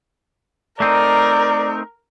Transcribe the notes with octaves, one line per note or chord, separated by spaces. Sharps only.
A3 C4 D#4 A#4 D5